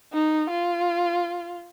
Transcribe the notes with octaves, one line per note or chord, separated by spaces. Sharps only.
D#4
F4